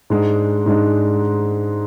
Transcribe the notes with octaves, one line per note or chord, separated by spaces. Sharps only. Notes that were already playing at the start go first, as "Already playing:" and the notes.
G#2 G#3 D4
G#2 G#3 D4